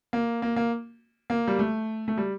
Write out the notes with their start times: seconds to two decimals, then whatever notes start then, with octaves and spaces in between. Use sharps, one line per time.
0.13 A#3
0.42 A#3
0.56 A#3
1.30 A#3
1.48 G3
1.59 A3
2.08 A3
2.18 G3